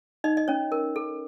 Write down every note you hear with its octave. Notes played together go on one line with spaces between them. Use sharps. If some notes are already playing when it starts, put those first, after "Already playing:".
D#4 D#5
D#5
C#4 C#5
A#4
A4